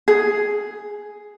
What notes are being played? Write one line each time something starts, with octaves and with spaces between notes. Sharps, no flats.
G#4